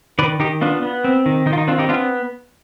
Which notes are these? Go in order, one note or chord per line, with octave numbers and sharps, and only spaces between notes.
D#3 B4 D5
D#3 D#4 G4
B3 D4 F4
B3
C4
D#3
D#3 D#4
F4
D#4
C4 D4 F4
D#4 G4
B3 D4 F4